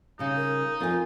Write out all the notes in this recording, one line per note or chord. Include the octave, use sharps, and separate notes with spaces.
C#3 G3 D#4
A#4
F2 F4 A#4 G#5